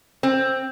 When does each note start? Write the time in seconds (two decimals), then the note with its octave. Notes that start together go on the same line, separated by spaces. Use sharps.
0.23 C4